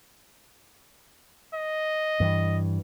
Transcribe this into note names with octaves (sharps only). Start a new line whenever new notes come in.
D#5
G2 E3